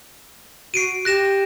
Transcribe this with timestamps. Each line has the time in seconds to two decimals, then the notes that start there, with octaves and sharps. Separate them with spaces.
0.74 F#4 C7 D7 D#7
1.05 G4 F#6 A#6 E7